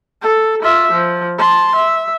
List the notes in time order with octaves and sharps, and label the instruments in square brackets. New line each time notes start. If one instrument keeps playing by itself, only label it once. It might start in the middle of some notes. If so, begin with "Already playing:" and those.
[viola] A4
F4 E5
F3
A5 C6
E5